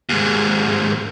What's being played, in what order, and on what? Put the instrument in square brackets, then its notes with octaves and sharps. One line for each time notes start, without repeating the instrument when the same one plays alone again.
[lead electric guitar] D#2 G#2